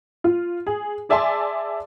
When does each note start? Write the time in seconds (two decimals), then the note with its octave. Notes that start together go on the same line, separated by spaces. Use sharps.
0.24 F4
0.67 G#4
1.09 G#4 D5 E5 G#5 A5 C6